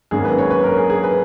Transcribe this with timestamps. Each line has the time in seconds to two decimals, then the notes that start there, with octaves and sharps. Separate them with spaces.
0.11 G#1 F#2 D#3 A#3 G#4
0.25 B4
0.39 C#5
0.50 B4
0.64 A#4
0.77 G#4
0.90 G#4
1.04 B4